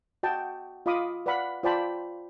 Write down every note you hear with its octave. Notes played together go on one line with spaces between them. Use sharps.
F#4 D#5 G5 A5
F4 D#5 F5 B5 D6 D#6
B4 D5 F5 F#5 B5
F4 C5 D5 G5 A5 B5